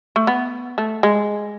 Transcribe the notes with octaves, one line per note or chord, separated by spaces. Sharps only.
A3
B3
A3
G#3